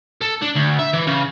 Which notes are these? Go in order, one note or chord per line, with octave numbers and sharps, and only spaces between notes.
A4
D4
D2
E5
E3
C#3